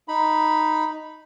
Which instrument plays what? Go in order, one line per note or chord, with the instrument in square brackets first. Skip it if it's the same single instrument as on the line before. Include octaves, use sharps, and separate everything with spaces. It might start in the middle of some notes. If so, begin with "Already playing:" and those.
[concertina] D#4 B5